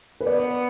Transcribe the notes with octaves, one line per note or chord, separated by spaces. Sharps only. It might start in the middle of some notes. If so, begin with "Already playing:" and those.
B4
B3 D5